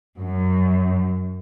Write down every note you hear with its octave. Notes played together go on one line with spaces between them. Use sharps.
F#2